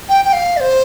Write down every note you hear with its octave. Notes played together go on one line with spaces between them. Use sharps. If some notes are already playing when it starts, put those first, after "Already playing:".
G5
G5
F5
D5
C5